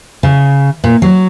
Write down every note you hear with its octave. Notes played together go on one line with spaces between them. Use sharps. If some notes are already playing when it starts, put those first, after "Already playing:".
C#3
A#2
F#3